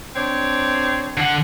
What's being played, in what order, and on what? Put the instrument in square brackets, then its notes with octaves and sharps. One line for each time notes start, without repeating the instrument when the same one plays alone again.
[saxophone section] C4 D4 C#5
[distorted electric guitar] D3 F#5